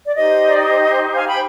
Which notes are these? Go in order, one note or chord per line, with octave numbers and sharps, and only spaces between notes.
D5
D#4 G4 C5 D#5
D5
D#5
F5 G#5
G5 B5